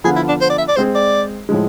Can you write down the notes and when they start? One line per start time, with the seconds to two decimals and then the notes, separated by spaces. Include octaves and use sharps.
0.04 D3 F3 B3 F4 G#4
0.16 E4
0.28 D4
0.41 C5
0.50 D5
0.58 E5
0.68 D5
0.76 G#3 C4 G#4 C5
0.95 D5
1.49 A2 F3 G#3